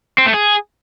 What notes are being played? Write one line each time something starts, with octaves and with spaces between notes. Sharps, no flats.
C4
A3
G#4